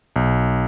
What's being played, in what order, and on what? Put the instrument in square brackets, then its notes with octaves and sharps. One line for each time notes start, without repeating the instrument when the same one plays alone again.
[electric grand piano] B1